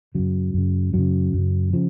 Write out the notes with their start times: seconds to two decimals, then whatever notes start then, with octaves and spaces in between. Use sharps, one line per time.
0.15 F#2 C#3 F#3
0.54 F#2 C#3
0.94 F#2 C#3 F#3
1.33 F#2 C#3
1.73 C#3 F3